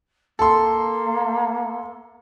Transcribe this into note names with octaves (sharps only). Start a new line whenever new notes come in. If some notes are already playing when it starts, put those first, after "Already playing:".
A#3 A4 C6